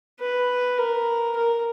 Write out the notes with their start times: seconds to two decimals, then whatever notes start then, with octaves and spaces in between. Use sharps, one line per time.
0.20 B4
0.78 A#4
1.36 A#4